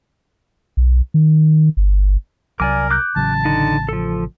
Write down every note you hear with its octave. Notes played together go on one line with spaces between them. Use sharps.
B1
D#3
G1
C2 F#3 A#4 D5 G#5 D6
D6 F#6 G6
A1 C#3 F#3 A5
D3 D#4
F3 A4